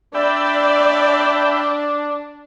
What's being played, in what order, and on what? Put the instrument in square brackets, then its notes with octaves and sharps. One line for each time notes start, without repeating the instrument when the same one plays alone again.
[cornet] D4 [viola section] D5 [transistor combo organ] E5 G5 B5